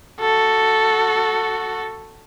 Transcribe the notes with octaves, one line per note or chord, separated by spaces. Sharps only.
F#4 A4